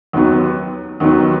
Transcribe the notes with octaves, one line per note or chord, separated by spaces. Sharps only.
D#2 D#3 F#3 B3
D#2 D#3 F#3 B3